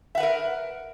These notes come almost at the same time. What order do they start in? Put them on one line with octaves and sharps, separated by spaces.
E5 F#5 B4 A#4